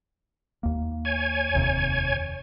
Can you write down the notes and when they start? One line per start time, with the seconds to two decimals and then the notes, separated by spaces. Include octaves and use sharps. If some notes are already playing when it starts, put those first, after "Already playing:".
0.63 D#2 A#3
1.05 C#5 G#5
1.53 F1 D#2 C3